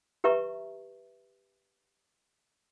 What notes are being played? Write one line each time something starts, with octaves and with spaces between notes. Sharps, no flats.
G4 B4 E5 A#5 C#6